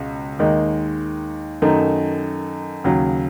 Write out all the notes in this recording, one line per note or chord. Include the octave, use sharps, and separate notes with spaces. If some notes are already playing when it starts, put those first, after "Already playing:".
Already playing: C#2 B2
D#2 D#3 G#3 D#4
F#2 D#3 A3 D#4
D#2 C#3 F#3